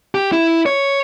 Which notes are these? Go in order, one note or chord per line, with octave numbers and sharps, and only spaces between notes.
G4
E4
C#5